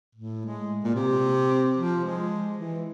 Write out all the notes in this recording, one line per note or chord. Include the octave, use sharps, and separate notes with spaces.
A2
G#3
A#2
C3
F3
G#3
E3